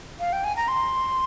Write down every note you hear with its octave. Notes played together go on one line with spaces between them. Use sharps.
F5
G5
G#5
A#5
C6